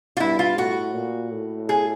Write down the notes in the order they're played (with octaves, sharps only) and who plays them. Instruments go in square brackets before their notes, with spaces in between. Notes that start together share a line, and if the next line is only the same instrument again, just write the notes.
[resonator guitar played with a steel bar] F4
[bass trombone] G2 [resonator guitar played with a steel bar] E4
[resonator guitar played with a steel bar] F4
[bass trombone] A2 [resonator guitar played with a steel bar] F#4
[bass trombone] A#2
A2
[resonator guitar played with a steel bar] G#4